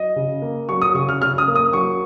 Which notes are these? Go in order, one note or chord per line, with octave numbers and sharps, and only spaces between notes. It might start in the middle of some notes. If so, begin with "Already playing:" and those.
Already playing: F#3 D#5
C#3
A#3
F#3 C#6
D#6
C#3 C#6
F6
C#3 F6
D#6
A#3
D#6
F#3 C#6